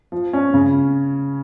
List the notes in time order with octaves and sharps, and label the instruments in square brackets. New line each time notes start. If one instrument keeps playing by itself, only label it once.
[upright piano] F3
C#4
C#3